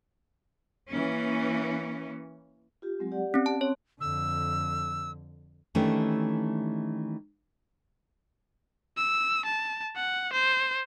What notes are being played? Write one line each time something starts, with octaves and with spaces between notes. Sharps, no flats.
E3 A#3 C#4
F4 G4
F#3 G#3 C4
G4 D5 F#5
C4 C#4
A5
C#5 C6
F2 D3 E6
D#3 E3 G3 A3 C#4 D4
E6
A5
F#5
C5